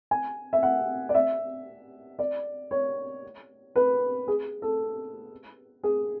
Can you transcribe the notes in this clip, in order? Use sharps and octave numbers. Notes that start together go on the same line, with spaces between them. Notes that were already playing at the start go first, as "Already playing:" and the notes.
G#5
E5
F#5
D5
E5
D5
C#5
B4
G#4
A4
G#4